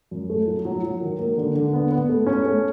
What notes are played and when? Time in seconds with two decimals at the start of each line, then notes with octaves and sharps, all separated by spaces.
0.11 F#2
0.30 A3
0.47 F#3
0.65 F#3
0.84 F#3
1.01 D#3
1.19 A#3
1.37 D3
1.55 D3
1.73 B3
1.91 B3
2.09 A3
2.26 C#4
2.45 A3